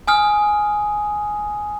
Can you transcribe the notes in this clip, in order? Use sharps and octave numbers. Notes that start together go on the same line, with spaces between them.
G#5 D#6 F6